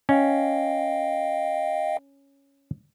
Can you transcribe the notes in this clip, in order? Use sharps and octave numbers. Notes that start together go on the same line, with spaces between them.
C#4 D#5 F5 G5